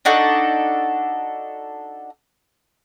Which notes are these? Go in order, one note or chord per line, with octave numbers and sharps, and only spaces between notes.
D4 D#4 F#4 A4